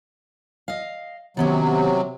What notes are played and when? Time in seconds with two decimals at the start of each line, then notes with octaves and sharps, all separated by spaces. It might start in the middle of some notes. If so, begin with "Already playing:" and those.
0.68 D#5 F5
1.37 C3 D#3 F#3 B3 C#4